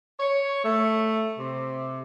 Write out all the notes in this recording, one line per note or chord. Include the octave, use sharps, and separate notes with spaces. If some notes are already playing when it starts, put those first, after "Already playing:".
C#5
A3
C3